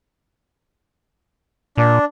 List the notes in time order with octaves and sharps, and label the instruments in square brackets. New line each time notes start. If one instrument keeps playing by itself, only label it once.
[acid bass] A#2 [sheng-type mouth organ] D4